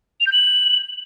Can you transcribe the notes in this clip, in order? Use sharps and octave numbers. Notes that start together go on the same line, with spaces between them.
F7
G6
F#7